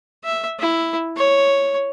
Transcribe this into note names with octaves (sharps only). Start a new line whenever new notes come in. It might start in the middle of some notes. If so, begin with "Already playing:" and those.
E5
E4
C#5